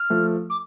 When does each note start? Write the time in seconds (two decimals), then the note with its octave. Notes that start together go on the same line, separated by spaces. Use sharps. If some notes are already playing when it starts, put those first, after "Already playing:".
Already playing: F6
0.10 F3 A3
0.50 D6